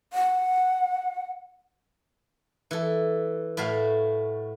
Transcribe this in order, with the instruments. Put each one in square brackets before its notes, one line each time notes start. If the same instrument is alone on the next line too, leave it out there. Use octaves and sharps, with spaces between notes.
[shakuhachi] F#5
[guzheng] E3 A4
A2 A3 F#4 F5